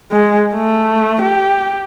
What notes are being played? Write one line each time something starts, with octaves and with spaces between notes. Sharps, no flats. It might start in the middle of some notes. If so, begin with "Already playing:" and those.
G#3
A3
G4